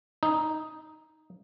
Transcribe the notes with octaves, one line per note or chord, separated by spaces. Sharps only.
D#4